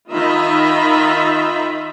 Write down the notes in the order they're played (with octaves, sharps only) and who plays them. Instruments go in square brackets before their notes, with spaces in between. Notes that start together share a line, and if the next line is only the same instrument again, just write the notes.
[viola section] D#3 F4 D#5 E5 A#5 B5